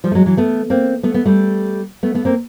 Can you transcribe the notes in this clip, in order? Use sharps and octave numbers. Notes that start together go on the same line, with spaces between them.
F3 G3
A3
F#3 G#3
E3 F#3
A3 B3
A#3 C4
A3 B3
A3 B3
G3 A3
A3 B3
A3 B3
A#3 C4